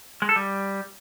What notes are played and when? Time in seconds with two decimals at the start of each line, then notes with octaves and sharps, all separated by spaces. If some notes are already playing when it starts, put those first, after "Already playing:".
0.22 G#3
0.29 A4
0.36 G3